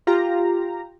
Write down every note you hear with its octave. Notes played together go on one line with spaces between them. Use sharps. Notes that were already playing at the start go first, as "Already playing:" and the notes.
F4 G4 A#5